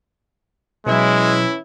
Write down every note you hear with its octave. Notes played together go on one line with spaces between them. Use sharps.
B2 E3 F#3 G#3 C#4 E4